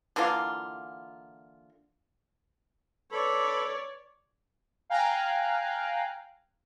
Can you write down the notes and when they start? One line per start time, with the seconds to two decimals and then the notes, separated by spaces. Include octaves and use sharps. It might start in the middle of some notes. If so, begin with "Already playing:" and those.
0.16 D3 E3 A#3 F4
3.12 A4 B4 C#5 D5 B5
4.90 F5 G5 G#5 A#5 F#6